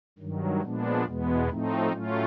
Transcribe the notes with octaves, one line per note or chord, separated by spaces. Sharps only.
G2 D#3 F#3
A#2 F3 G#3 B3 D4
E2 B2 G#3 B3
A2 F3 A3 C4 D#4
A2 F#3 A3 C#4 F4